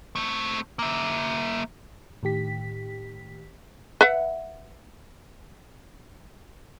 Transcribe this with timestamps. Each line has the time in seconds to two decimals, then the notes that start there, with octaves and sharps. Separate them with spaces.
0.15 A3 C4
0.79 A#3 E5
2.23 A2 D#3 G4 B6
4.01 B4 E5 F#5